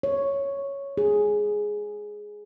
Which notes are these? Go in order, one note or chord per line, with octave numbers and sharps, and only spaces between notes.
C#5
G#4